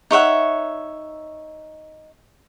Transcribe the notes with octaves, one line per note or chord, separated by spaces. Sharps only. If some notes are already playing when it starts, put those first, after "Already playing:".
D#4 C#5 E5 F#5